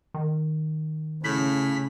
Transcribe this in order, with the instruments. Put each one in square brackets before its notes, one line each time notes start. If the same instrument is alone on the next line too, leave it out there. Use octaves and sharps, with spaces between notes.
[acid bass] D#3
[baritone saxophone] A2 [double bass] C#3 [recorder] B6